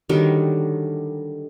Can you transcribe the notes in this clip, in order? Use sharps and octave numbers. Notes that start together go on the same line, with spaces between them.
D3 D#3 F#3 G3